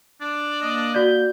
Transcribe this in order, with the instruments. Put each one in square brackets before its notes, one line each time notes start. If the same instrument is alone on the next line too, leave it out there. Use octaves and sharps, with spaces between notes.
[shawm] D4
[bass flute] A#3 [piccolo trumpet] D#5
[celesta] F#4 D5 [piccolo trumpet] G6